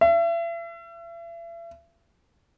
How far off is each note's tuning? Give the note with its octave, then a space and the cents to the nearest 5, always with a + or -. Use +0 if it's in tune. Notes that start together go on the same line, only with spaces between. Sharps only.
E5 +40